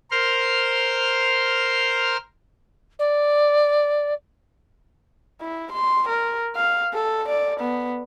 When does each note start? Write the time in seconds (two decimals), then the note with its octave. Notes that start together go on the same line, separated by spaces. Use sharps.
0.11 A#4 C5 C6 F6
2.99 D5
5.41 E4
5.72 C6
6.09 A#4
6.56 F5
6.94 A4
7.28 D5
7.60 B3